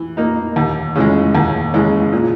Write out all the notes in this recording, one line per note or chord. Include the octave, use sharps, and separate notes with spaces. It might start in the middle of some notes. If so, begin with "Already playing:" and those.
Already playing: E3
A#3 D#4
D#2
C#3 E3 G#3
D#2
C#3 E3 G#3
A#2